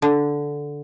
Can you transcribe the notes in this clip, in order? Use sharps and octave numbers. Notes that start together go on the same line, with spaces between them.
D3